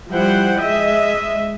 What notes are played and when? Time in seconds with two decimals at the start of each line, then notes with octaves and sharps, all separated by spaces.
0.10 F3 G3 E4 C5 F#5 G5
0.58 G#3 D#5 E5